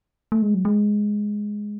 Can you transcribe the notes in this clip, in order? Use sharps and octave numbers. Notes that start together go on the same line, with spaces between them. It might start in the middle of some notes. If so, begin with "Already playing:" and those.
A3
G#3
F#3
G#3